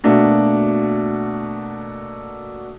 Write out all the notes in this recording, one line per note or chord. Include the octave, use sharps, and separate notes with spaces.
B2 A3 A#3 D4 F#4